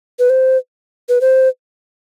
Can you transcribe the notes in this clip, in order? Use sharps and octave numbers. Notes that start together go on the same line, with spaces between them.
B4
C5
B4
C5